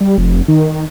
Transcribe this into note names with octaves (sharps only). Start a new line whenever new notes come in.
G3
F1
D#3